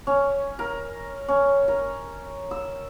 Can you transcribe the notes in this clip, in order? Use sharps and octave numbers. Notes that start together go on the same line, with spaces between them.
C#4
A#4
C#4
A#4
E6